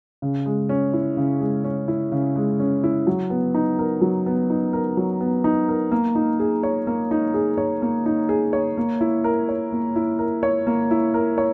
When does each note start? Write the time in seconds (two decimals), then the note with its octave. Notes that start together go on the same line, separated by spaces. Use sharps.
0.22 C#3
0.46 G#3
0.69 C#4
0.93 E4
1.17 C#3
1.41 G#3
1.64 C#4
1.88 E4
2.12 C#3
2.36 G#3
2.60 C#4
2.84 E4
3.07 F#3
3.30 B3
3.55 D#4
3.79 A#4
4.01 F#3
4.26 B3
4.50 D#4
4.73 A#4
4.97 F#3
5.21 B3
5.44 D#4
5.69 A#4
5.92 A#3
6.15 D#4
6.40 G#4
6.63 C#5
6.87 A#3
7.11 D#4
7.34 G#4
7.58 C#5
7.82 A#3
8.06 D#4
8.29 G#4
8.53 C#5
8.77 A#3
9.01 E4
9.24 A#4
9.49 C#5
9.72 A#3
9.96 E4
10.19 A#4
10.43 C#5
10.67 A#3
10.91 E4
11.14 A#4
11.38 C#5